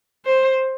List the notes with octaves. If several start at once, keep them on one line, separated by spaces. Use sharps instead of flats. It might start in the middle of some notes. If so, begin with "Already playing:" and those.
C5